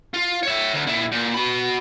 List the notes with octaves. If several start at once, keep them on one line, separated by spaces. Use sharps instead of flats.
F4
C#5 E5
D2
A#2 E4
A#2
F#4 B5